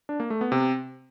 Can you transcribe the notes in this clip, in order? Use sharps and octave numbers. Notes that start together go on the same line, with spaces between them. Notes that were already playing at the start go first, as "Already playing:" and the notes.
D4
A#3
A3
B3
C3